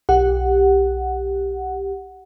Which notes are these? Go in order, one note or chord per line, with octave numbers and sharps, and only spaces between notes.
B1 G4 F#5